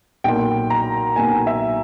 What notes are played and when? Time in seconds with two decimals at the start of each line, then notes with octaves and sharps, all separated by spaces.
0.24 B1 A#2 G5
0.70 A#5
1.16 B1 A#2 G#5
1.47 E5